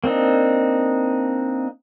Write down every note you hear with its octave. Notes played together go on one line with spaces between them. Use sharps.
A#3 C4 D4 D#4